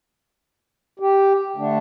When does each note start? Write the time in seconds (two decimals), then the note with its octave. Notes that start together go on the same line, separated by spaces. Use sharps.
1.00 G4
1.56 D3 A3 D4